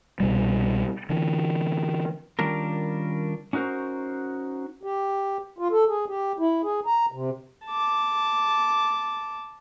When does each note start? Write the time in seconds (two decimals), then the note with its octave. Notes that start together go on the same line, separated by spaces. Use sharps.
0.20 C2 B2 G3
1.09 D3 E3
2.39 D#3 G3 C#4 D4 F4 A#4
3.53 C#4 D#4 F#4 A#4 C5
4.83 G4
5.59 F4
5.71 A4
5.88 G#4
6.08 G4
6.39 E4
6.64 G#4
6.86 A#5
7.12 C3
7.66 A5 D6